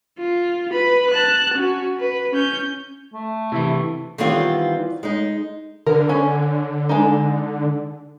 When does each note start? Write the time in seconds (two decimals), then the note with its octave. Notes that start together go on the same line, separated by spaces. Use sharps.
0.19 F4
0.72 B4 B5
1.10 A5 F#6
1.54 C#4 F#4
1.99 B4
2.33 C#4 G6
3.14 A3
3.52 C3 E3 E4
4.18 D#3 E3 G3 B3 C4 F4
5.03 G#3 D#4
5.86 D3 A#4
6.09 C#4
6.89 G#3 D4 D#4